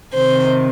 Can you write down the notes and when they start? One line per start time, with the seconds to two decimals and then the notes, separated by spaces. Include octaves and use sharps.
0.14 C3 D#3 C5